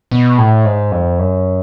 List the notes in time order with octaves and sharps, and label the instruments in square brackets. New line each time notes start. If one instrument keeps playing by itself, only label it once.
[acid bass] B2
A2
G#2
F2
F#2